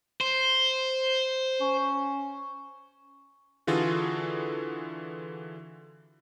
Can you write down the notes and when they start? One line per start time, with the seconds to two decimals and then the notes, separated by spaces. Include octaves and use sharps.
0.21 C5
1.61 C#4
3.67 D3 E3 F4 F#4 G#4 A4